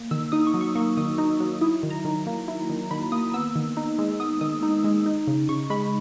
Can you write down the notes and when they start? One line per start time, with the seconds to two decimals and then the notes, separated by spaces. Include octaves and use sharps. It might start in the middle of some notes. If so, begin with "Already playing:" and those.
Already playing: A#3
0.11 D#3 E6
0.32 D#4 D#6
0.47 C#6
0.54 F#3
0.61 C#6
0.75 A#3 C#6
0.97 D#3 D#6
1.18 D#4
1.40 F#3
1.61 E4 D#6
1.83 D#3
1.90 A#5
2.05 D#3
2.27 A#3
2.48 E4
2.69 D#3
2.91 D#3 B5
3.12 A#3 D#6
3.34 B3 E6
3.56 D#3
3.77 D#4
3.99 G#3
4.20 B3 D#6
4.41 D#3 D#6
4.63 D#4
4.84 G#3
5.06 D#4
5.27 C#3
5.49 C#3 C#6
5.70 G#3 B5